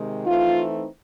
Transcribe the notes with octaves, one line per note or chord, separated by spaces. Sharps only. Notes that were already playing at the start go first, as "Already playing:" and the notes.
Already playing: C3 D#3 G#3
E3 A3 C4 D#4 F4